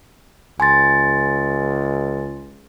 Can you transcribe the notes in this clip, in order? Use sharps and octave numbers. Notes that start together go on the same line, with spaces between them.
C#2 G#5 C6 A6